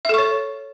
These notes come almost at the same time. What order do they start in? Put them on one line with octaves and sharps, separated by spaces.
E5 A4 C#6 C#5